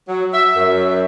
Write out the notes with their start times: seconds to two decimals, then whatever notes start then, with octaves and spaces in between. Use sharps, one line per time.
0.09 F#3
0.33 E5
0.56 F#2